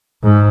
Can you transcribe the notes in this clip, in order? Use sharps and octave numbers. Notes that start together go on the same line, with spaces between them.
G#2